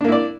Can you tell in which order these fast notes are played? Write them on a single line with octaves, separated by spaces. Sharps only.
D4 A#3 E4 D5